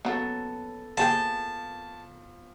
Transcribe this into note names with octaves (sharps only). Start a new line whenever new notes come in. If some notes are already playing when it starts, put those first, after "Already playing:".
C#3 F#3 B3 A4
F2 A#3 G#4 G5 A5